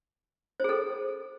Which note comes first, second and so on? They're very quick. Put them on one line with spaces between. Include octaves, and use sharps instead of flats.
C5 G#4 A4